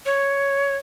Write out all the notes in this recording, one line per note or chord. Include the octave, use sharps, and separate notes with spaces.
C#5